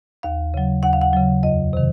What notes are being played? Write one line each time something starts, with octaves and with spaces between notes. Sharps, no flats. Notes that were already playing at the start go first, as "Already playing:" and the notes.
D#2 F5
C#3 F#3
D#2 F#5
F5
F#5
C#3 F#3
F2 D#5
C3 D#3